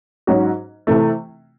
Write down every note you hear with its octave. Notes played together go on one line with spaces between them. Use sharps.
G#2 F#3 C#4 F#4
C3 E3 A3